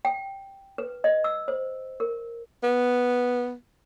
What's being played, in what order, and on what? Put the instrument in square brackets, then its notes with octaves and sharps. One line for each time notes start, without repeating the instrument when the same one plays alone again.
[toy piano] G5
B4
D#5
E6
C5
A#4
[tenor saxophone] B3